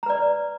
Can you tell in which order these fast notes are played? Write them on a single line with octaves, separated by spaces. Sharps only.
A#5 B4 D5